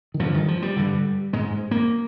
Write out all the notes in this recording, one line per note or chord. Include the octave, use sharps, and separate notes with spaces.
D#3
G2 D3 F3
D#3
F3
G3
G2 D3
G#2 G#3
A#3